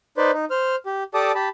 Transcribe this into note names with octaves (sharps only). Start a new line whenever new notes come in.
D#4 B4 C5 D5
D#4
C5 F6
G4
G4 A4 D5 A5 D6 D#6
G4 A5 B5